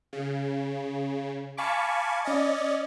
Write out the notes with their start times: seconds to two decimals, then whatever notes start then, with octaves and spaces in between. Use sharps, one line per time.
0.13 C#3
1.57 F5 G#5 A5 B5 C#6 D6
2.25 C#4 D5 D#5